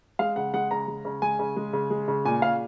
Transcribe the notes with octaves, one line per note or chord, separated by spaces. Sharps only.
G#3 F5
C#3 F#5
G#3 F#5
C#3 A#5
G#3
C#3
G#3 G#5
C#3
G#3
C#3
G#3
C#3
A#2 G#5
A#2 F5